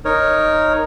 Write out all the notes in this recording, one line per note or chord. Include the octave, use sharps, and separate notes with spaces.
D#4 A#4 C#5